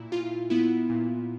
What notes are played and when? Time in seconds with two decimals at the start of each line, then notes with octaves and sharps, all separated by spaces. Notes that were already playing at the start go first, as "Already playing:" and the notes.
Already playing: A#2 E4
0.12 A#2 F4
0.50 B3 E4
0.90 A#2